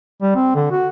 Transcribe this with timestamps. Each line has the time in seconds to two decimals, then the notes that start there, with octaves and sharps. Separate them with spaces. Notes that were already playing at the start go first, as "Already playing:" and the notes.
0.22 G3
0.35 C4
0.55 D3
0.71 F#4